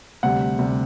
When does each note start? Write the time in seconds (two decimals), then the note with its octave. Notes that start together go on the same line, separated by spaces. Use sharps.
0.23 D2 C3 G3 F#5
0.59 D2 C3 G3